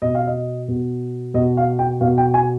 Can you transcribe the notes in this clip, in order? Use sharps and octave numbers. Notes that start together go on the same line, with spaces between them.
B2 D#5
F5
D#5
B2
B2 D#5
F5
G5
B2 F5
G5
G#5